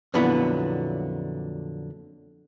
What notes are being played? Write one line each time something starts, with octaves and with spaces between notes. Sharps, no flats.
F2 A#2 D3 F#3 B3 E4